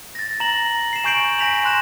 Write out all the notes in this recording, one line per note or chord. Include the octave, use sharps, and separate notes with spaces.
A6 A#6
A#5 A#6 F#7
C7 E7
G#5 C#6 G6 C7 D7 F#7
G#5 A#6 B6 F7 F#7
G#5 C6 F#6 A#6 E7